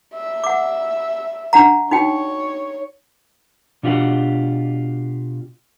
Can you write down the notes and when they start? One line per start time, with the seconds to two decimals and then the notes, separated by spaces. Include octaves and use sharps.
0.14 E5
0.44 F#5 D6
1.53 D4 F#5 A#5
1.91 D#4 F#4 C#5 G5
3.83 B2 D4 F4 G4 A#4 F#5